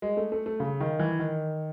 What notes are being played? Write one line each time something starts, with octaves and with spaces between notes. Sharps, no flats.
G#3
A3
A3
A3
C#3
D#3
E3
D#3